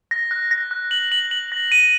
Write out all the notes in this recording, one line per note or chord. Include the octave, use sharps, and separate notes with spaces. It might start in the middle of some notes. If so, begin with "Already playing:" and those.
A#6
F#6
A#6
F#6
F#7
F#7
F#7
A#6
D#7